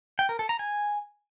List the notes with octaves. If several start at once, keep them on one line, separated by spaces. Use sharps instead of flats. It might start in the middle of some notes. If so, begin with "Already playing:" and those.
G5
A#4
A4
A#5
G#5